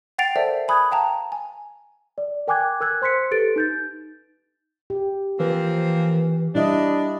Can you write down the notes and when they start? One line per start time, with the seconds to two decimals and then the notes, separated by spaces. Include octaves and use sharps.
0.18 F#5 G5 A6 C7 D7 F7
0.36 A4 A#4 C5 D5 E5 A5
0.68 G#5 B5 D#6 F#6 G#6
0.91 F5 G5 A5 A#5
1.32 G#5
2.18 D5
2.47 A#4 G5 G#5 D6 F#6 G#6
2.80 A#4 E6 F#6 G#6
3.02 C5 C6 F#6 B6 C#7
3.31 G4 A4 B4 A6 D7
3.56 D#4 G6 A6
4.90 G4
5.40 E3 F3 A#3 C4
6.55 G3 D4 E4 D#5